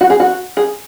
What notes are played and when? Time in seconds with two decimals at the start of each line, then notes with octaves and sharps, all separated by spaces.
0.01 F#4
0.10 G#4
0.20 F#4
0.57 G#4